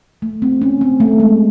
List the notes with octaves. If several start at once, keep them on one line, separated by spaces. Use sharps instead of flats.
A3
C4
C#4
C4
A3
G#3